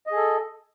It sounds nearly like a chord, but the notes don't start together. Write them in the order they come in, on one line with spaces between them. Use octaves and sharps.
D#5 G#4 A4